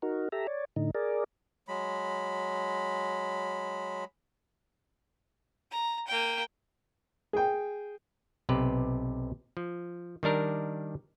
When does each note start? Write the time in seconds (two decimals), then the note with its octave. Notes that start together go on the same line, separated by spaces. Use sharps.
0.02 D#4 F#4 A#4
0.32 G4 A4 E5 A#5
0.47 C#5 D5
0.76 A2 D3 D#4
0.95 G#4 A#4 D5
1.68 F#3 G#3 B5
5.71 A#5
6.07 A#3 G5
7.33 G#4 G5
8.49 B1 C3 G4 B4
9.57 F3
10.23 D#3 G3 D4 A#4